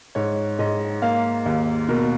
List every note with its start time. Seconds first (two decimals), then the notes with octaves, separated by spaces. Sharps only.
0.15 G#2 C#5
0.59 G#2 D#5
1.02 A#3 F5
1.46 D#2
1.89 B2 A#4